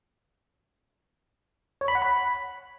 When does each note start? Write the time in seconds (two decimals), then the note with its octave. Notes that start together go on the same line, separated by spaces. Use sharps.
1.81 C#5
1.88 B5
1.95 F#5
2.02 B5